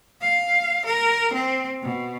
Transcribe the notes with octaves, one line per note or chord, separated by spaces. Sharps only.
F5
A#4
C4
B2